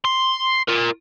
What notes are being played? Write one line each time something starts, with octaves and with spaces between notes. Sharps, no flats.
C6
F4 A#4